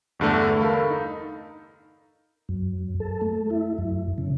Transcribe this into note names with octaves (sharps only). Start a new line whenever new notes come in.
E2 G2 D3 A3
A4 A#4 F5 B5
D#4
F#2
A4
A3
E4
F#2
C#3